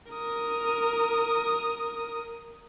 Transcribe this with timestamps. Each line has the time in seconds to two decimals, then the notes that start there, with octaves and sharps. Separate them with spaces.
0.10 A#4 D#6